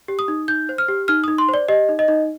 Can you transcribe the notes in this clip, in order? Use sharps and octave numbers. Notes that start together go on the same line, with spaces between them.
G4
D#6
D#4
D#4 G6
C5
F6
G4
D#4 F6
D#4 D#6
C6
C5
D5
G4 D#5
D#4
D#5
D#4